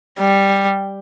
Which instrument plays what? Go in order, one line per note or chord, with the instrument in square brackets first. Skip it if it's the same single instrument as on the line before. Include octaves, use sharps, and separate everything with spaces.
[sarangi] G3